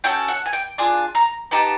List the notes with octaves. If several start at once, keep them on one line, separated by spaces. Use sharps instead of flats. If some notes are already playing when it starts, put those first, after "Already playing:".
C#4 F#4 A4 G5
F#5
G#5
G5
D4 F4 G#4
A#5
B3 D#4 G4 A5